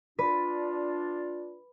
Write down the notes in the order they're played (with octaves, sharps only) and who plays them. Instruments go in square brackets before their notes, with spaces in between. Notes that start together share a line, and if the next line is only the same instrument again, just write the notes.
[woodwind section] D4 F4 [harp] B4